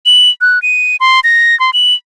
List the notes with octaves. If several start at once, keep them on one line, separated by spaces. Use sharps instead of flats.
F#7
F#6
D#7
C6
A#6
C6
F#7